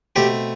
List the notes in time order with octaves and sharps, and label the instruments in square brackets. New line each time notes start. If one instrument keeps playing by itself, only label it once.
[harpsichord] B2 A3 C4 G4